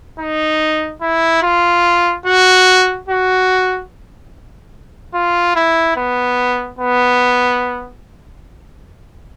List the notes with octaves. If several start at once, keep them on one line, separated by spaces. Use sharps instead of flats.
D#4
E4
F4
F#4
F#4
F4
E4
B3
B3